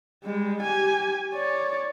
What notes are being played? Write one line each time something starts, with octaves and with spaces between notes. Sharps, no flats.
G3 G#3
G4 G#5
C#5 D5